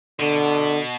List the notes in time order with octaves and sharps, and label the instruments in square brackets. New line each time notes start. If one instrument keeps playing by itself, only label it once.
[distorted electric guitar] B2 [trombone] D3